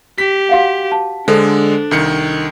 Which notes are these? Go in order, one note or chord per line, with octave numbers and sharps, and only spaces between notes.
G4 B6
F#4 F5 F#5
A5
D3 G#3 D4 A4 C5
C2 D#3 C#7